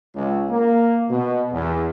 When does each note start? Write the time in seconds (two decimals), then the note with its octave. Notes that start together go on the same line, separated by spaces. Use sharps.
0.14 C#2
0.50 A#3
1.09 B2
1.52 E2